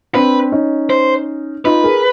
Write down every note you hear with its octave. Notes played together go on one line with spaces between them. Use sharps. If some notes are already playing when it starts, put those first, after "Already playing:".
C4 D4 B4
C#4 D#4
C5
D#4 F4 B4
G#4 A#4